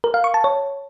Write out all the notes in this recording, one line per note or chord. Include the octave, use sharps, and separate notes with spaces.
A#4
F5
C#6
A5
C#5